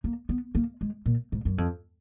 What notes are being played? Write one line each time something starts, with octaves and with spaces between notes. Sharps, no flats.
A#3
B3
A#3
G#3
A#2
G#2
F#2
F2